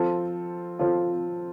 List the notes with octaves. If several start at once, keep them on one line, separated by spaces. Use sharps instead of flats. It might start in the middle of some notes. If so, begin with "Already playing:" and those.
Already playing: F3 C4 F4 A4
F3 C4 F4 A4